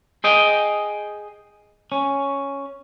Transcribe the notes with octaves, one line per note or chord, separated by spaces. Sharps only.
G#4 D#5 G5
C#4